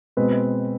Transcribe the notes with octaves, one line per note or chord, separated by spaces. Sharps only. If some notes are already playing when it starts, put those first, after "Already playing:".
B2 G#3 C4 B4